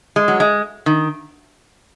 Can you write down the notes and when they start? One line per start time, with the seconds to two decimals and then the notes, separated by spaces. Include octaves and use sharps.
0.16 G#3
0.28 F#3
0.40 G#3
0.86 D#3